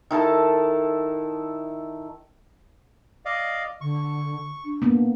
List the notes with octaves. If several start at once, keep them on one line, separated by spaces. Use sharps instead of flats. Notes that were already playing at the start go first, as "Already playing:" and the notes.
D#3 E4 A4 A5
D5 D#5 F5
D3 C#6
D4
A#3 B3